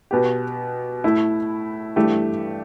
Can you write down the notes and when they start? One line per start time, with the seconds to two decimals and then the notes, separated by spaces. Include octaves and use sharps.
0.11 B2 B3 G4
1.04 A2 A3 E4
1.96 G2 E3 A3 G4